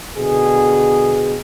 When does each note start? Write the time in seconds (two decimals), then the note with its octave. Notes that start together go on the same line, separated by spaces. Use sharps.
0.16 B2 D3 G#4